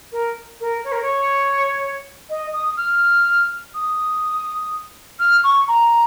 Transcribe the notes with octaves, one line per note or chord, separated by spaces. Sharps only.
A#4
A#4
C#5
A#4
C#5
D#5
D#6
F6
D#6
F6
C#6
A#5